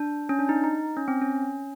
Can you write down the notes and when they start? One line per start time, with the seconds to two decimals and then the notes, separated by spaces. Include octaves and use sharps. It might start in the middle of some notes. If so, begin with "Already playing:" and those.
Already playing: D4
0.29 C#4
0.39 D4
0.49 D#4
0.64 D#4
0.97 C#4
1.08 C4
1.22 C#4